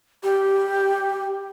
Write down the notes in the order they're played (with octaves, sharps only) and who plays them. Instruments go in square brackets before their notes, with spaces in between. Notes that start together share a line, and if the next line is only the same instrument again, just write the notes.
[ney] G4